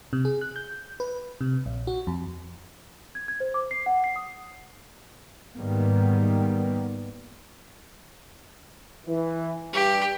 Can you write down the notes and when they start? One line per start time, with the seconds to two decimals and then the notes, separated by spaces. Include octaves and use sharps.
0.13 C3
0.25 G#4
0.41 F#6
0.56 G6
1.00 B4
1.41 C3
1.66 A#1
1.87 F#4
2.07 F2
3.15 G#6
3.28 G#6
3.40 C5
3.54 D6
3.71 C7
3.86 F#5
4.04 C7
4.16 D#6
5.57 G#2 D#3 G3 A#3 B3
9.06 E3
9.73 G2 G4